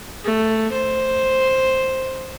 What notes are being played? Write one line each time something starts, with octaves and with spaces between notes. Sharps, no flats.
A3
C5